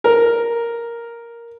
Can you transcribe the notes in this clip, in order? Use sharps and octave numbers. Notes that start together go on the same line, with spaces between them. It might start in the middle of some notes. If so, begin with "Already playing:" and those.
A#4